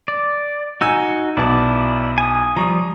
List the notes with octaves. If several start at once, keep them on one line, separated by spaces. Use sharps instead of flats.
D5
D#4 F#4 G#5 E6 D#7
B1 B3 E4 D5 A5
G#5 D#6
F3 G3 A#5 C#6 D#6